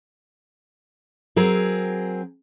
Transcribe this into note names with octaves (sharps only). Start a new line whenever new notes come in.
F#3 C4 G#4 A#4